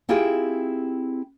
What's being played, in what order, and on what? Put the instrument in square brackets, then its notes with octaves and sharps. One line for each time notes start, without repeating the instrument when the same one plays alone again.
[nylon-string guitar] C4 E4 F4 G4 G#4 G5